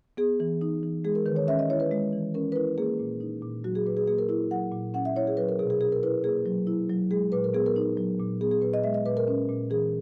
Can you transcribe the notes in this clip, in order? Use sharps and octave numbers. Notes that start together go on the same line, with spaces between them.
B3 G#4
E3
D#4
E3
G#3 G#4
A#4
D#3 B4
C#5
C#4 E5
D#5
E4 C#5
B4
G#3
E3
C#4 A#4
B4
E4 A#4
A#3 G#4
A#2
D#4
A#2
F#3 F#4
G#4
A#2 B4
G#4
A#3 G#4
A#4
E4 A#4
F#3 F#5
A#2
C#4 F#5
E5
E4 C#5
G#4
F#3 B4
A#4
B2 G#4
G#4
C#4 G#4
A#4
E4 B4
A#3 G#4
F#3
E4
F#3
G#3 G#4
A#2 B4
A#4
B3 G#4
A#4
D#4
F#3
A#2
B3 G#4
G#4
A#2 B4
D#5
G#3 E5
D#5
A#2 B4
A#4
C#4
A#2
E3 G#4